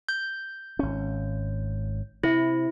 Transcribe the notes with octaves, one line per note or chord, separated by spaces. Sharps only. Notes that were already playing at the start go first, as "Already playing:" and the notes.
G6
G#1 C#4
C3 E4